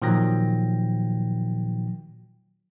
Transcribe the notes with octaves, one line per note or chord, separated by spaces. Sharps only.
A#2 D#3 F3 F#3 G5 A#6